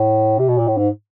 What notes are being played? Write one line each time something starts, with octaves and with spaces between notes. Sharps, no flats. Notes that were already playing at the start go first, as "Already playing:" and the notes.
Already playing: A2
C3
B2
A#2
A2
G#2